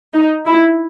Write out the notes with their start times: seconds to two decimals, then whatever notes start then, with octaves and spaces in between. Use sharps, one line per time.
0.14 D#4
0.46 E4